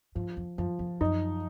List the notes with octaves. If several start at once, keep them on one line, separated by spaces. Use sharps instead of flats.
G#2 F3
F2
F#2 F3
F2
F#2 D#4